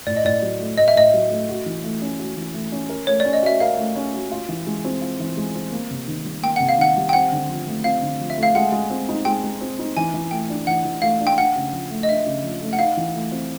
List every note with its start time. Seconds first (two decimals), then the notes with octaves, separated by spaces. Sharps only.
0.07 A2 D5
0.16 D#5
0.24 A2 D5
0.42 F#3
0.60 A3
0.77 A2 D#5
0.88 E5
0.95 A2 D#5
1.14 F#3
1.30 A3
1.49 F#4
1.66 E3
1.83 A3
2.02 C#4
2.19 F#4
2.37 E3
2.54 A3
2.72 C#4
2.89 A#4
3.07 A3 C#5
3.20 C#4 D5
3.33 D#5
3.43 F#4 E5
3.60 A#4 F5
3.78 A3
3.96 C#4
4.14 F#4
4.31 F4
4.49 E3
4.67 G#3
4.85 C4
5.01 F4
5.20 E3
5.37 G#3
5.55 C4
5.72 A#3
5.91 C3
6.08 D#3
6.25 G3
6.43 A#3 G5
6.56 C3 F#5
6.69 F5
6.78 D#3 F#5
6.97 G3
7.09 G5
7.13 C4 F#5
7.32 D3
7.49 F3
7.67 A3
7.84 C4 F5
8.02 D3
8.20 F3
8.30 E5
8.38 A3 F5
8.55 G#3 F#5
8.72 G#3
8.90 C4
9.09 D#4
9.25 G#3 G5
9.44 G#3
9.61 C4
9.79 D#4
9.97 E3 G#5
10.14 E3
10.31 A3 G5
10.50 D4
10.67 E3 F#5
10.85 E3
11.02 A3 F5
11.20 D4
11.27 G5
11.37 D4 F#5
11.56 C#3
11.72 F3
11.91 A3
12.03 D#5
12.09 D4 E5
12.27 C#3
12.43 F3
12.62 A3
12.73 F#5
12.79 D#4 F5
12.97 E3
13.14 A3
13.32 C4